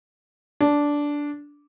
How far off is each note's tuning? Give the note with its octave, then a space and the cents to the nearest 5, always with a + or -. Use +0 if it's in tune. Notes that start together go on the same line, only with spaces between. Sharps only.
D4 -10